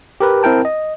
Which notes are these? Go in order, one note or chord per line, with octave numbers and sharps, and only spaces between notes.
G4 A#4 B4
C4 E4 A#4 G5 A5
D#5